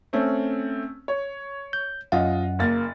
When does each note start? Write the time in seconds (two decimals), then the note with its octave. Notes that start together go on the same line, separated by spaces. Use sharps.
0.13 A3 C4 C#4
1.08 C#5
1.73 G6
2.12 F#2 F4 D#5 F#5
2.59 F#1 A#3 A6